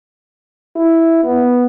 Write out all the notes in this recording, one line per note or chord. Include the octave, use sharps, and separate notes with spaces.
E4
B3